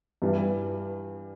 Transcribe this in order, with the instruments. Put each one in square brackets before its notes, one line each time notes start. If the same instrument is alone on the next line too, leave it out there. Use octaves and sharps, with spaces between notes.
[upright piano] G2 E3 G3